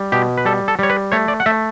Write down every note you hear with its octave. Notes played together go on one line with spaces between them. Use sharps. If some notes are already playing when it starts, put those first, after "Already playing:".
Already playing: G3
B2 G4
B4
G3 A4
A4
G3 C#5
B4
A3 C#5
D5
F#5
A3 E5